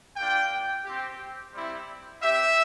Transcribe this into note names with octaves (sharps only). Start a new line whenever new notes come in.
A#3 D4 F4 G5
C4 G4
G3 C4 E4
C4 G4 E5